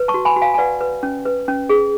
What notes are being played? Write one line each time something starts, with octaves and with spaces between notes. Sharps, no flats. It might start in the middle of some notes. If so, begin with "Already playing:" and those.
Already playing: B4
A5 C#6
F#4
G#5 B5
F#4
F5 G#5
G#5
B4 D5 F#5
B4
C#4
B4
C#4
G#4